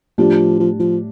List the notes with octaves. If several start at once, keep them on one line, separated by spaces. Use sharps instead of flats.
A2 F3 G3 D4 G4
F3
F3